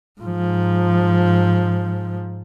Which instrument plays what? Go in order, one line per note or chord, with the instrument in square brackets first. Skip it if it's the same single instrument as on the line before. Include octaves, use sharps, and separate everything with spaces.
[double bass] G#2 F3